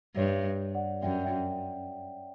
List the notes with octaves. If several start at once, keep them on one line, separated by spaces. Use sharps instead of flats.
G2 C#5 E5
D5 F#5
F#2 E5 G5
E5 G5